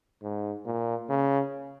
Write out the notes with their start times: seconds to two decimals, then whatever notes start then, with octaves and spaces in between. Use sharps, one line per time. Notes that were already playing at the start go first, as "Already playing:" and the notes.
0.23 G#2
0.65 A#2
1.09 C#3